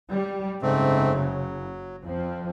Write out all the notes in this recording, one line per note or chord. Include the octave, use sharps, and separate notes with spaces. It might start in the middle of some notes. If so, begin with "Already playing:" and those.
G3
F#1 G#2 C#3 A3 C4
F#3
F2 F3 C4